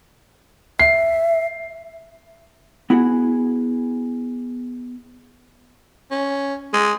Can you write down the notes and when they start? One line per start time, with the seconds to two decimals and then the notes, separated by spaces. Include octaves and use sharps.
0.79 E5 C7
2.90 B3 E4 F#4 G#4 F#5
6.11 C#4
6.73 G#3